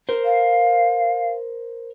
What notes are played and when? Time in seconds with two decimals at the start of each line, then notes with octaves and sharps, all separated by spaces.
0.09 A#4 C5
0.25 F5